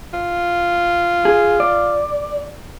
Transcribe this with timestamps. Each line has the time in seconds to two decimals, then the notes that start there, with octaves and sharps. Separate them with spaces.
0.13 F4
1.25 G#4
1.60 D5